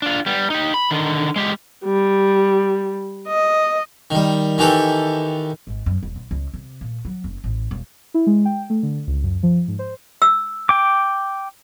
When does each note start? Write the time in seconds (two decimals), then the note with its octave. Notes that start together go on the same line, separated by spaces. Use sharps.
0.02 D4 F4
0.26 G3 B3
0.50 D#4 G4
0.74 B5
0.91 D3 D#3
1.36 G#3 G4
1.85 G3
3.27 D#5
4.11 D#3 G3
4.58 D#3 E3 G4 A4
5.67 G#1
5.86 F#2
6.03 E1
6.16 B1
6.31 C#2
6.54 C3
6.81 A#2
7.05 F#3
7.24 F#1
7.44 A1
7.71 E1
8.14 E4
8.27 G#3
8.45 G5
8.70 A3
8.83 D3
9.07 C#2
9.23 F#2
9.43 F3
9.68 G#2
9.79 C5
10.22 E6
10.69 G5 D6